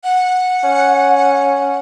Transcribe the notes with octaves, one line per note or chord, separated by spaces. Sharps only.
F#5
C#4